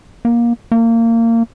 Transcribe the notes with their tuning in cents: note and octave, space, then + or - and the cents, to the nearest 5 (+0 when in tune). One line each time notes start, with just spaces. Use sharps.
A#3 +20
A#3 -25